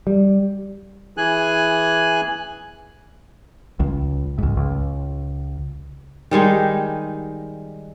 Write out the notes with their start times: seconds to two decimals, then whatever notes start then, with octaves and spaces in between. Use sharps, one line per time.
0.07 G3
1.17 E3 G#4 G#5 F#6
3.80 C#2
4.38 C#2 G#2
4.57 C#2
6.31 D#3 G3 G#3 D#4